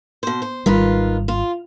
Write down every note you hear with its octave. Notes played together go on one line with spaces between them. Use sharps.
B2 C5
C5
G#1 D#3 G3 F4 B4
F4